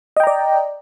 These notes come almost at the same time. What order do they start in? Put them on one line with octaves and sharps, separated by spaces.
D#5 G5 A#5 D5